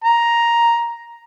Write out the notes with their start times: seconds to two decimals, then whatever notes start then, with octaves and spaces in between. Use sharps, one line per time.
0.04 A#5